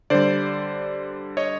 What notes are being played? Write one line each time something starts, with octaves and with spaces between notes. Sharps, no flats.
D3 G3 C5 D5
C#5 D#5